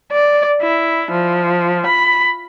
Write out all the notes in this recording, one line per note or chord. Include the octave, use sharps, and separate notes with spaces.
D5
E4
F3
B5